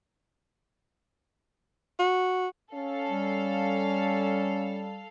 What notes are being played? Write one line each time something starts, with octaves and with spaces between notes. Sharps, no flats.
F#4
C#4 A4 F5
G3